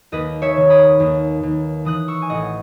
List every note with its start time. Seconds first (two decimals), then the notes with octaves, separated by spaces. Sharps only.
0.12 D#2 B4 D#5
0.42 C#5 E5
0.57 D#3
0.70 B5 D#6
1.00 D#2
1.43 D#2
1.85 E3 D#6 F#6
2.08 C#6 E6
2.22 G#5
2.30 A1 D#5 F#5